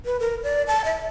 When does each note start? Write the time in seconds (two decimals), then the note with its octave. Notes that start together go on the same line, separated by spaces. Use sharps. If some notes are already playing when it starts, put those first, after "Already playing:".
0.05 B4
0.20 A#4
0.43 D5
0.67 A5
0.85 E5